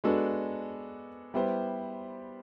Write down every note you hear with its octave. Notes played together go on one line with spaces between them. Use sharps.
G#3 B3 D4 F#4 A4
G3 B3 E4 G4 C5